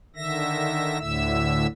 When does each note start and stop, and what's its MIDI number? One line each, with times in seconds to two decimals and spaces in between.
0.16 0.99 50
0.16 0.99 51
0.16 0.99 76
0.16 0.99 94
0.99 1.67 38
0.99 1.67 45
0.99 1.67 50
0.99 1.67 76
0.99 1.67 88